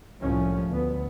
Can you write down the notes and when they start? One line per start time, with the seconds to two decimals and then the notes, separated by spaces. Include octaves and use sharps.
0.21 C2 A2 F3 C#4
0.69 D2 B3